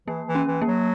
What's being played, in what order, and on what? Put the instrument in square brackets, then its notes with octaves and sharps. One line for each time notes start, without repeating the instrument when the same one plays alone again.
[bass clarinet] E3 [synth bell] A#3
[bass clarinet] E3
[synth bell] C#4
[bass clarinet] E3
[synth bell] A#3
[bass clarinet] F#3